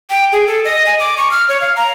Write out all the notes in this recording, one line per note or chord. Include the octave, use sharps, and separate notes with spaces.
G5
G#4
A4
D#5
G#5
D6
C#6
F6
C#5
F5
A#5